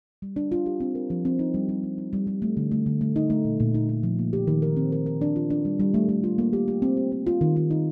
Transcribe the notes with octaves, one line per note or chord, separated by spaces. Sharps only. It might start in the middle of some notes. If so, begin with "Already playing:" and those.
G3
D4
F4
G4
C4
A#4
F3
C4
D#4
G3
G3
G3
D#4
G3
G3
A3
D3
A3
D3
A3
D#4
A3
A#2
A#2
D#4
D#4
F3
A#3
G4
D#3
A#4
C4
A#4
A#4
D4
F4
D4
G3
G3
A3
A3
F4
A#3
G4
G4
C4
G4
C4
F4
D#3
F4
D#4